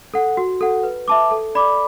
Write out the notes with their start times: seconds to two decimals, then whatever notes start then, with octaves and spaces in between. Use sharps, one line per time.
0.14 A4 F#5
0.37 F#4
0.61 A4 F#5
0.83 B4
1.08 E5 A5 D6
1.31 A4
1.55 D5 B5 D6